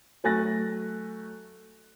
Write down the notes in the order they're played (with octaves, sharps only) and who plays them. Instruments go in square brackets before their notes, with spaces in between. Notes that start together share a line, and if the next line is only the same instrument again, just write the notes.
[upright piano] F#3 A3 G#5 F#6 A6 A#6